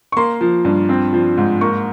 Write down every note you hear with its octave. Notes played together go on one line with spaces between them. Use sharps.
C#6
A#3 C6
F3
G2
C4
F3
G#2
A#3 C#6